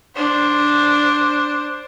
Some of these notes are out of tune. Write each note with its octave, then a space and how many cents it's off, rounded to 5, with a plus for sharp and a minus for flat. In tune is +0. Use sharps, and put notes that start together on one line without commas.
D4 +0 C5 +0